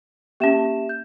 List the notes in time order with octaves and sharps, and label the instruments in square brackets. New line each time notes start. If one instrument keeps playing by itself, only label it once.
[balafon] A#3 C#4 [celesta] G4 E5 E7
[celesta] G6